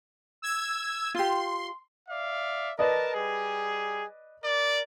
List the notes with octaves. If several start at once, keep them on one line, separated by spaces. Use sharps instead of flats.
E6 G#6
F4 G4 C6
D5 E5 F5
A#4 B4 D5 D#5 A5
G3 G#4
A#4 D5